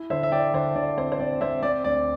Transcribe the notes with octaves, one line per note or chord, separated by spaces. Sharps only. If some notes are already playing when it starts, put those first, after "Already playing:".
Already playing: E4
D3 C5 E5
E5
E4 D5 G5
D3 C5 E5
D3 D5
C4 C5
C5
C4 D5
C4 C5 E5
C4 D5
D2 D5